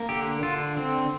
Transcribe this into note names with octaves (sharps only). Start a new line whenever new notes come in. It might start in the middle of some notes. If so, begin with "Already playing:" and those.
Already playing: A#3
D3 G4
D3 F4
C4